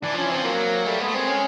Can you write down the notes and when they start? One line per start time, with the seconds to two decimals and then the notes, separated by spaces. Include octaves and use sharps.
0.02 E3 D4
0.13 F3 C#4
0.24 E3
0.30 F3 C4
0.44 F#3 A#3
0.86 G3 A3
1.00 G#3 B3
1.08 A3
1.14 G#3 C4
1.28 C#4